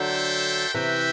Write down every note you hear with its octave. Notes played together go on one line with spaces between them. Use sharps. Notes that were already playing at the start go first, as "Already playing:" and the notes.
Already playing: D3 F#3 D4 A4 C5 E5 G5
C3 E3 F#4 B4 E5 G5